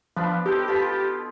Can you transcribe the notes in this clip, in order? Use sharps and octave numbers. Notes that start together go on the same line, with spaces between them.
F3 B3 D4 B4
D#4 G4 A4 C5
B2 F4 B5